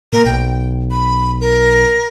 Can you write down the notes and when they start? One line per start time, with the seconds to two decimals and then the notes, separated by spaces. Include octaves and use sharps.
0.13 A#2 A#4
0.26 B1 G5
0.91 B5
1.41 A#4